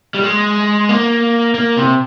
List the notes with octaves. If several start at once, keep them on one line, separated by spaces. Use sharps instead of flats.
G3
G#3
A#3
A#3
C3